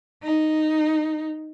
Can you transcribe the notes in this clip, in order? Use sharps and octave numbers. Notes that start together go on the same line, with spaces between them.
D#4